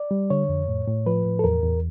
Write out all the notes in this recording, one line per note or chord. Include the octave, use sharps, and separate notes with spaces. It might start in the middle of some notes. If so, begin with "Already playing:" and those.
Already playing: D5
G3
D3 C#5
F2
A2
A2
F3 B4
A2
A4
E2 A#4
E2